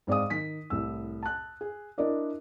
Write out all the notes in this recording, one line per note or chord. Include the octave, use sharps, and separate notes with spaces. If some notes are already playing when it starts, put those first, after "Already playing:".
G#2 C4 D5 F5 D#6
D#3 B6
C2 A2 E6
A5 F#6
G#4
D4 E4 A#4 D5 D#5